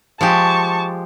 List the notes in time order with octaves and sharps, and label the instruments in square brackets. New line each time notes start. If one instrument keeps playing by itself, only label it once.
[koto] F3 G#3 G4 [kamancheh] A5 C#6